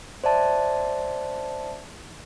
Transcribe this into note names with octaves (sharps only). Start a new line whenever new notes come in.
C5 D5 E5 A5